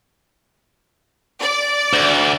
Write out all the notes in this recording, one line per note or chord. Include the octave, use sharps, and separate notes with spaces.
D5
D2